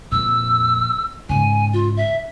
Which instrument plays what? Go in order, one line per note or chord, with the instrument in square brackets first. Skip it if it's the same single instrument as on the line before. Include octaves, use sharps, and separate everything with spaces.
[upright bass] F2 A#2 [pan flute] E6
[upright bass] G#2 C#3 [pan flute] G#5
[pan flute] F4
E5